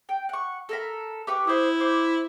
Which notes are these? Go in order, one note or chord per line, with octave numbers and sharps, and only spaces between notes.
G5
F#5 C#6
A4 A#4 B5
G4 B4 C#6
E4 C5 D#6
C5 C6 D6